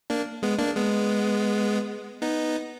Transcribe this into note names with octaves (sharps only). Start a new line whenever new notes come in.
A#3 D4
G#3 B3
A#3 D4
G#3 B3
B3 D#4